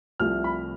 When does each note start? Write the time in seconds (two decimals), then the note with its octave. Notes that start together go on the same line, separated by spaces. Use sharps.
0.20 C2 C3 F3 A3 F6
0.44 B5